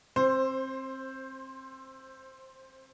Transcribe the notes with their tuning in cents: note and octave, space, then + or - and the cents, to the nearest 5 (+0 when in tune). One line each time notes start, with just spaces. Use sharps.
C4 +25 C5 +5